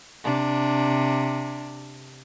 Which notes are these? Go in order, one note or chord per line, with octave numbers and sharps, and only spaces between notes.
C3 D4